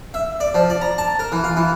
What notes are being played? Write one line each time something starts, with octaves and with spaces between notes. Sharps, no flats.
E5
D5
F3
D5
A#5
A5
A#4
E3
F4
E3